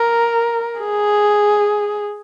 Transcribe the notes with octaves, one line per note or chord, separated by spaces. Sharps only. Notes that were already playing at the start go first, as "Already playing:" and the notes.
Already playing: A#4
G#4